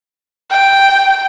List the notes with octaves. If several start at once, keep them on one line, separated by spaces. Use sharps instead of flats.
G5